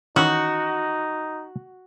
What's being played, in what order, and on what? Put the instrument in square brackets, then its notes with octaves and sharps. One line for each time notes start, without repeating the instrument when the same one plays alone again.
[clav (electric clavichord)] D#3 E3 C#4 [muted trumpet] D#4 [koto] F#4